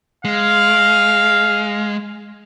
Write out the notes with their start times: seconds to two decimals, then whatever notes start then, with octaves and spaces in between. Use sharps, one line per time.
0.25 G#3 F5